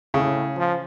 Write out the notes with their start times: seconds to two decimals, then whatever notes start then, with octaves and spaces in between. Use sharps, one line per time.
0.14 A2 C#3
0.56 F3